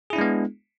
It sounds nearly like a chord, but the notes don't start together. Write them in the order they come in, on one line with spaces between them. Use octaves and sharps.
G#4 E4 D4 G#3 B3